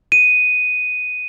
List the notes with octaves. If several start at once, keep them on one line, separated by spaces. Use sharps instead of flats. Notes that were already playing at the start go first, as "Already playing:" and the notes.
D#7